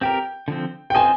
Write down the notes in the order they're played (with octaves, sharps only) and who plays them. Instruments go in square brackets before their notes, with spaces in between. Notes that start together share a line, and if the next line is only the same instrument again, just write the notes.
[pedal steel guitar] C4 G4 A#4 [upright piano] G5
[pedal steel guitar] D3 F3 C4
[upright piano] G5
[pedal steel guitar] C4 F4 C5 D#5 [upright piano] G#5